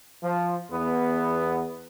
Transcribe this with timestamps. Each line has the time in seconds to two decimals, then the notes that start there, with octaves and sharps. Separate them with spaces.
0.23 F3
0.70 E2 B3